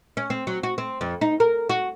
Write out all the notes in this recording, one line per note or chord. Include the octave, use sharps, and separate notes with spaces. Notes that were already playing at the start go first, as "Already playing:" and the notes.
C#4
C4
F#3
F#4
C4
F2
D#4
A#4
F#4